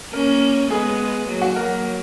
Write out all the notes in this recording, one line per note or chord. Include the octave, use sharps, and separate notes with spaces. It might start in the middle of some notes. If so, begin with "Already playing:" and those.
A#3 C#4 A#4
G#3 B3 G#4
F#3 A#3
F#4
F#3 A#3 A#4